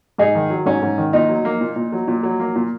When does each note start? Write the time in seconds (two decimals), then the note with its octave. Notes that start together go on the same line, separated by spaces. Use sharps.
0.18 G#2 D#4 G#4
0.35 D#3
0.50 F#3
0.66 G#2 C#4
0.82 G#2
0.98 D#3
1.13 A#2 D#4
1.29 F#3
1.45 A#3
1.61 A#2
1.76 A#2
1.92 F#3
2.08 A#2
2.23 F#3
2.40 A#3
2.56 A#2